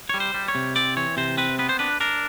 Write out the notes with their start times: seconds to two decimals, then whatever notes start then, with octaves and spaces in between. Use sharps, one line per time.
0.09 G3 C#5
0.20 C5
0.34 G3
0.48 C#5
0.55 C3
0.76 C4 D5
0.96 E3 C#5
1.17 C3 C5
1.38 C4 B4
1.59 B3 B4
1.69 C5
1.79 D4 B4
2.00 D4 A#4